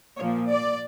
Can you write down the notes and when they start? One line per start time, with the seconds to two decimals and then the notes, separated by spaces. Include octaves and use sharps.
0.17 A#2 F3 A#3 C#5
0.47 D5